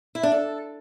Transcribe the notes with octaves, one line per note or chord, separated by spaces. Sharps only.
E4
D4
A4